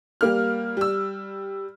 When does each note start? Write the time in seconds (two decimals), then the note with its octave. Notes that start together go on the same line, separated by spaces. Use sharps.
0.21 G3 A#3 F6
0.77 G3 E6